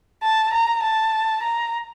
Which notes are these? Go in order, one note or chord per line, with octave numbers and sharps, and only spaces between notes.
A5
A#5
A5
A#5